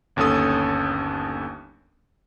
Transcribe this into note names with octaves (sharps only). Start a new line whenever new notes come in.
G1 D#2 C#4 A4 D#6